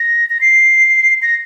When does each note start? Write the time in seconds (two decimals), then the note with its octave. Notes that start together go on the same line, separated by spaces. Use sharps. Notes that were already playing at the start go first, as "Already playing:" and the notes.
Already playing: A#6
0.30 A#6
0.41 C7
1.22 A#6